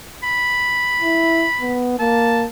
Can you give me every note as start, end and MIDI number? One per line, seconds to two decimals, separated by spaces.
0.23 1.81 83
1.03 1.46 64
1.61 1.97 59
1.99 2.47 58
1.99 2.43 81